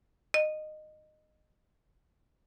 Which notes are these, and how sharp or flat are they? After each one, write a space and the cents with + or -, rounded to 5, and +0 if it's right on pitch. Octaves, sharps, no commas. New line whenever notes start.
D#5 -20